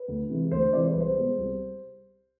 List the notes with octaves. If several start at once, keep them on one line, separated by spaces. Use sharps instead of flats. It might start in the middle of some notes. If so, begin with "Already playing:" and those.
Already playing: B4
D2
C3 E3 G#3
D2 C5
C3 E3 G#3 D5
C5
C2 B4
C5
B2 G#3
C2